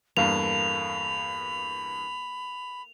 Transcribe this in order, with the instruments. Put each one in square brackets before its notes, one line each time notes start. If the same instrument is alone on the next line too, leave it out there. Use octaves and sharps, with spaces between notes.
[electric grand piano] E2 G2 [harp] A#3 A4 F5 [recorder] B5 [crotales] F7